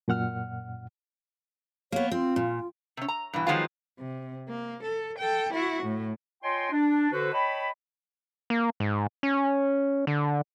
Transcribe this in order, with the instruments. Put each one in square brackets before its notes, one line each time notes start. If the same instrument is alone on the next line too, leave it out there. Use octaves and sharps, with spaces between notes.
[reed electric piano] F#2 A#2 F#5 F6
[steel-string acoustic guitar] A#3 B3 [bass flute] C#5
[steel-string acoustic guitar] C4 [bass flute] F4
[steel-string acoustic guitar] A#2
[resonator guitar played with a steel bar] C3 C#4
A#5
G2 B2 E3
D#3 F3 F#3 G#3 B3 F4
[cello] C3
A#3
A4
A4 G5
E4 F#4
A2
[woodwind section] F4 C#5 D#5 G5 G#5 C6
D4
D3 F#4 B4 C5
C#5 D#5 G5 A5 B5
[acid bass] A#3
G#2
C#4
D3